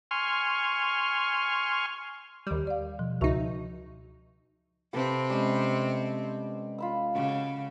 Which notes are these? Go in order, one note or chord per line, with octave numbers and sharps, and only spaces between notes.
G#5 C6 C#6 F6
D#2 G3
D5 F5
B2 F3
C#2 D#4 F#4 E5 C#6
C3 C4 G4 A4 B4
G3 G#3 C#4 D#5
F4 B5 E6
C#3 F#4 D6